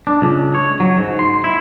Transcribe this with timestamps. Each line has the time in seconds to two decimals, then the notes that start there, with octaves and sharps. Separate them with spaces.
0.07 D4
0.22 C#2
0.55 C#5
0.80 F#3
0.98 G#2
1.19 C6
1.44 E4